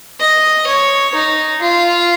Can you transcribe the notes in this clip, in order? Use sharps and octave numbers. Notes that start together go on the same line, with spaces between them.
D#5
C#5
D#4
F4